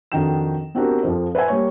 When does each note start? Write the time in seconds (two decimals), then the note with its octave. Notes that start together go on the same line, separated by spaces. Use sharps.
0.12 F2 D#3 D4 F#4 G5 E7
0.75 B3 C4 D4 F#4 G4 A#4
1.03 F2 F3 C5
1.35 B4 C5 E5 G#5
1.48 G3 A#3 C#5